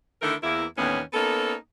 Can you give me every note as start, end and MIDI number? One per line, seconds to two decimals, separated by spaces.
0.22 0.34 50
0.22 0.34 51
0.22 0.34 57
0.22 0.34 64
0.22 0.34 69
0.22 0.34 70
0.43 0.65 40
0.43 0.65 58
0.43 0.65 64
0.78 1.00 39
0.78 1.00 45
0.78 1.00 50
0.78 1.00 52
0.78 1.00 59
0.78 1.00 61
1.13 1.53 58
1.13 1.53 59
1.13 1.53 61
1.13 1.53 63
1.13 1.53 69